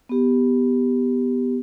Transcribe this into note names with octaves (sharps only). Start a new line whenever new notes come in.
B3 G4